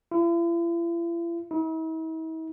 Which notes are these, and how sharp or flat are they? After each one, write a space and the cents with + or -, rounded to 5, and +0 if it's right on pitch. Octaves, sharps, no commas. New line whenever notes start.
E4 +45
E4 -45